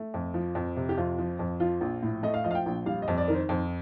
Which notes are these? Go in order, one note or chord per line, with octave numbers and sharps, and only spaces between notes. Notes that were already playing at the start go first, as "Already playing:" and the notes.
Already playing: A3
F2
F3
F2
C3
G4
F2 F4
F3
F2
F3 F4
A#1
A2
A3 D#5
F5
F3 D#5
F5
G5
A#1
G3 F5
D#5
F2
D5
D#3 A#4
C5
F2 C5